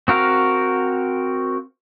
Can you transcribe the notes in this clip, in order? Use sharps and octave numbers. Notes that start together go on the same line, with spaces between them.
C4 F#4 A#4 F5